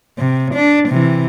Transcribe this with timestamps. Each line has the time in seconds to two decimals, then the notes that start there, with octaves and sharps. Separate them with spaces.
0.19 C3
0.55 D4
0.89 C3 E3